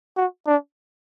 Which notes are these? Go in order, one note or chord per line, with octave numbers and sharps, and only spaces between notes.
F#4
D4